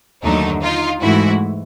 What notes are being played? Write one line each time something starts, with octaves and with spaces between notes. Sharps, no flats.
D#2 D3 F#3 A3 D#4
D#4 F4
G#2 E3 A3 E4 F#4